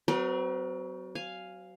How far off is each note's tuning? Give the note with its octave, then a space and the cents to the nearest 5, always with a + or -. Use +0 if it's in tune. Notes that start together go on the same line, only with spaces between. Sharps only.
F#3 +20 C4 -30 A#4 +45
F5 +0 G#5 +0